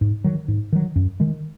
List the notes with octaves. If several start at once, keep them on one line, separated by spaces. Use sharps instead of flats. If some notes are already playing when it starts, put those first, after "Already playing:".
G#2
D#3 F#3
G#2
D#3 F#3
F#2
D#3 G#3